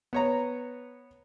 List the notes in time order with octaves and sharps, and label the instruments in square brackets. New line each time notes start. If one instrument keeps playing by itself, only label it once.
[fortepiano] B3 C#5 A#5